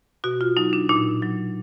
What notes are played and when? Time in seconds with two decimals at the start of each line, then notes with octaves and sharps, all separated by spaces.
0.24 B2 F#4
0.41 F4
0.57 F#3 D#4
0.73 D4
0.89 A#2 D#4
1.22 F#3